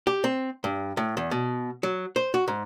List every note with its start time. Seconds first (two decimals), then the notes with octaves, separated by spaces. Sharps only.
0.07 G4
0.24 C4
0.64 G2
0.97 A2
1.17 E2
1.31 B2
1.83 F#3
2.16 C5
2.34 F#4
2.48 G#2